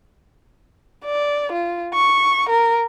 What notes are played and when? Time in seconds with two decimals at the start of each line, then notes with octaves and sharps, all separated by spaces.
1.06 D5
1.53 F4
1.94 C#6
2.50 A#4